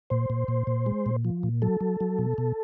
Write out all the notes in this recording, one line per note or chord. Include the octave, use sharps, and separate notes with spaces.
A#2 C5
A#2
A#2
A#2
G#3
A#2
F3
A#2
F#3 A4
F#3
F#3
B2
B2